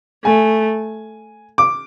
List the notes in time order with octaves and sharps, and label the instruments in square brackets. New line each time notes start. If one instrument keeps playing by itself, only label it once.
[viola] A3 [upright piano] G#5
[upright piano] D6